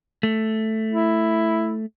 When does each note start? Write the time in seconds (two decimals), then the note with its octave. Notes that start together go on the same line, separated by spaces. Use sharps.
0.23 A3
0.92 E4